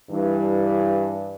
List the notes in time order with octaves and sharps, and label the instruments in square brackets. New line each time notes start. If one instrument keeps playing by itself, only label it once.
[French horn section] G2 E3